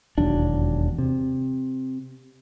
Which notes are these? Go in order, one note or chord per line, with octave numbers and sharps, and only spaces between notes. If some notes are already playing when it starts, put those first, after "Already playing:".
E1 D#2 F#3 D4
C3